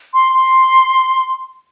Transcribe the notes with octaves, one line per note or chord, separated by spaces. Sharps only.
C6
C6